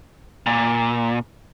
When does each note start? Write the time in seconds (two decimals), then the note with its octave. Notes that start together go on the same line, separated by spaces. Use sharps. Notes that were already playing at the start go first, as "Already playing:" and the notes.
0.46 A#2